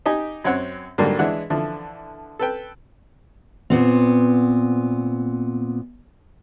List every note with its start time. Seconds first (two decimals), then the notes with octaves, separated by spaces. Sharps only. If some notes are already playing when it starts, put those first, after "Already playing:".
0.06 D#4 G4 D#5 G#5
0.44 F#2 C4 C#5 F#5
0.98 G#2 D3 F#3 G3 A#3
1.19 E3 G#3 D4 F#5
1.50 D3 E3 F3
2.39 A4 B4 G5
3.70 A#2 B3 C4